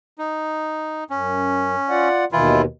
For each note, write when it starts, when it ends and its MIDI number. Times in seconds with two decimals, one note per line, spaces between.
0.18 1.04 63
1.10 1.75 42
1.10 2.09 61
1.89 2.25 65
1.89 2.25 74
1.89 2.25 78
2.32 2.65 39
2.32 2.65 47
2.32 2.65 51
2.32 2.62 52
2.32 2.62 64
2.32 2.62 65